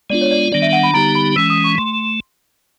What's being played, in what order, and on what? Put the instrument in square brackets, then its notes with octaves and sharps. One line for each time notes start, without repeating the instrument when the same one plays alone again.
[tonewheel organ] G#3 B3 D4 F4 [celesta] D5
[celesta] C#5
D5
[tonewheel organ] D#3 G3 B3 D4 [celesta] D5
[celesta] E5
F#5
B5
[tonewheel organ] D3 G3 B3 D#4 G4 [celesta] A#5
[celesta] B5
[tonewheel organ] E3 G#3 C#4 [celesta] E6
[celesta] D#6
C#6
[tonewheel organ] A3 [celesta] C6